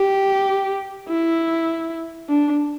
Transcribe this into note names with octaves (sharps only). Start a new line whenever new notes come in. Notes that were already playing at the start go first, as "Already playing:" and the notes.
Already playing: G4
E4
D4